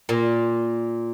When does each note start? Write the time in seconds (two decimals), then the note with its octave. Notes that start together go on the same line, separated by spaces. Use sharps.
0.09 A#2